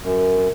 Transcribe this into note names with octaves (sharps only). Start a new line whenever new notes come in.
F#2